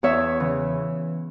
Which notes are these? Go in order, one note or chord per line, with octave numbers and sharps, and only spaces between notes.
E2 C#5 E5
C#3 E3